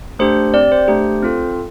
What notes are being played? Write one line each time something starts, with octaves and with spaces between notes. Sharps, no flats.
A3 D4 G4 C5
C4 G4 D5
C5
A3 D4 G4
C4 F4 A4